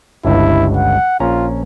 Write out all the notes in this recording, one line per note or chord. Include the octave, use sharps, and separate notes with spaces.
G1 C#2 G2 E4
F#5
A#1 C#4 F4 A#5